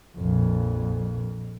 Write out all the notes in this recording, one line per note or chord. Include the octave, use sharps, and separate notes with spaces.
A#1 F2